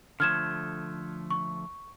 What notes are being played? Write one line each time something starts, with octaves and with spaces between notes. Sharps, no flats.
D3 F3 A3 F6 G#6 E7
C#6